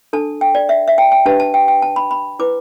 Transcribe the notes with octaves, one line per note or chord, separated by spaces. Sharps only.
D4 A4 A5
G5
D5
E5
E5
G5
G5
D4 G4 B4 A5
A5
G5
G5
A5
B5
B5
E4 B4 D6